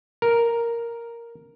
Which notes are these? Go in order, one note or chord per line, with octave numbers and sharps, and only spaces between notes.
A#4